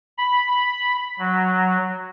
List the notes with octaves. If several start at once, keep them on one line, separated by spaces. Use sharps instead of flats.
B5
F#3